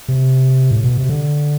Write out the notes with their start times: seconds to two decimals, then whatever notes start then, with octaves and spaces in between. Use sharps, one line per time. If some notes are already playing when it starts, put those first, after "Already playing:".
0.08 C3
0.71 A2
0.84 B2
0.97 C3
1.09 D3